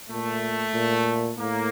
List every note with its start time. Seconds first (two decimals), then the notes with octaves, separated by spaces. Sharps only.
0.10 A#2 A3
0.74 A#2
1.38 A2 A#3